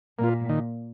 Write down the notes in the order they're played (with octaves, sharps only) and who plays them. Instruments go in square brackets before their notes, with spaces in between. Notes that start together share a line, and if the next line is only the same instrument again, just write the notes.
[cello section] A#2 [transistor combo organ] A#3 F4
[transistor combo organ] D#3